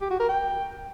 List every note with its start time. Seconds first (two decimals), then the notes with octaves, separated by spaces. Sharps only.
0.01 G4
0.11 F#4
0.20 A#4
0.29 G5